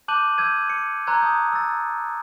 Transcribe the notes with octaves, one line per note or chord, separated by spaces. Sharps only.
A5 D6 F#6 G6 D#7 F#7
E6 G6 G#6 D#7
C#7
A#5 C6 E6 F#6 G#6
A5 D#6 G6
E6 A6